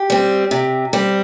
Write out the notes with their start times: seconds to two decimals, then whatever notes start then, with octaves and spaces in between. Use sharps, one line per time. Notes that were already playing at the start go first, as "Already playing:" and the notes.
Already playing: G4
0.10 G3 C4
0.51 C3
0.93 G3 C4